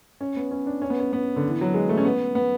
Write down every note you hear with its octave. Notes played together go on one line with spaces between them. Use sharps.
C#4
B3
C#4
D4
C#4
B3
C#4
B3
D3
E3
F#3
G#3
A3
C#4
B3
B3